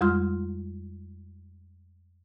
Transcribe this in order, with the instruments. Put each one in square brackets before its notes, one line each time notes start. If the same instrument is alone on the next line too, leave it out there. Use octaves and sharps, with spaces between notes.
[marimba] F2 G3 G#3 F4 C6 F6